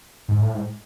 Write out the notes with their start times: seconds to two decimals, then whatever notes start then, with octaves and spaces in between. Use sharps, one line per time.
0.28 G#2
0.41 A2
0.54 G#2